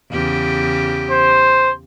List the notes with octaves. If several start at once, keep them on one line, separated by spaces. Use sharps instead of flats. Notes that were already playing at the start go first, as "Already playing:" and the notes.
E2 C#3 G4
C5